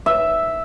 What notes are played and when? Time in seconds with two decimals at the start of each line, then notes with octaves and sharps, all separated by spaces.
0.06 E5